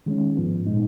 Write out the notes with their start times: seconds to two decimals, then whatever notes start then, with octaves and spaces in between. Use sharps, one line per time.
0.06 D#3 G#3 C#4
0.36 G#2 F3 B3
0.66 A#2 G#3 D#4